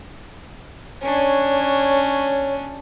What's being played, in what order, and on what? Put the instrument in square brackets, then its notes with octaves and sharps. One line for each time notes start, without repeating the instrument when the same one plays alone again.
[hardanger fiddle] C#4 D4 [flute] C#5